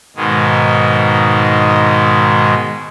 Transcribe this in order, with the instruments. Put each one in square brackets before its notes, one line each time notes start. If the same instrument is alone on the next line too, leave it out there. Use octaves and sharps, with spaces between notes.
[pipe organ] G#2 B2 D#3 G#3